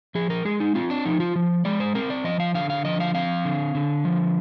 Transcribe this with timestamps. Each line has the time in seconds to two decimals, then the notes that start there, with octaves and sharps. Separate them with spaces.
0.15 F3 G#4
0.30 A#4
0.45 G#3 G#4
0.60 D#4
0.75 C4 F4
0.90 D4
1.05 F3 D#4
1.20 F4
1.36 F3
1.65 G#3 D5
1.80 C5
1.95 C4 A#4
2.10 D5
2.24 F3 D#5
2.40 F5
2.54 D3 F5
2.70 F5
2.85 F3 D#5
3.00 F5
3.15 C4 F5
3.45 D3
3.75 D3
4.05 F3